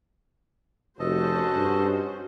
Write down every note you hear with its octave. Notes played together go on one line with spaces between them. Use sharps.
F1 C#4 F#4 A4 C5 D#5 A5
G2